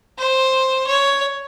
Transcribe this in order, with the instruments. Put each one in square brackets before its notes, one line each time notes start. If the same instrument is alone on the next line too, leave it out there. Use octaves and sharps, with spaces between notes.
[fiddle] C5
C#5